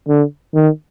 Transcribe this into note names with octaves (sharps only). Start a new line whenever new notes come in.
D3
D#3